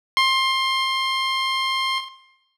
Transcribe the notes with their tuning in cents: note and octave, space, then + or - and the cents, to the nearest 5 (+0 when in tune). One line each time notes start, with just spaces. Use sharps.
C6 +20